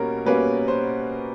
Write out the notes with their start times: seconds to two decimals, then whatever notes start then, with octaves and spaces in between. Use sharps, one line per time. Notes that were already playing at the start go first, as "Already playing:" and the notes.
Already playing: B2 G3 A#3 C#4 A#4
0.25 B2 G3 A#3 C#4 B4
0.68 C5